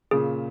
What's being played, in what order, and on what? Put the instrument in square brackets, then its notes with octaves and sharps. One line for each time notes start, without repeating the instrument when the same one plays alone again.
[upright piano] A#2 C#3 [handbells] G#4